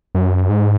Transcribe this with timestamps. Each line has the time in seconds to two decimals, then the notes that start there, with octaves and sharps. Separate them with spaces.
0.15 F#2
0.49 G#2